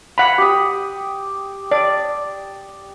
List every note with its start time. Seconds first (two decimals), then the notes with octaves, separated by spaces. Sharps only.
0.18 F#5 B5
0.38 G4 D#6
1.71 D5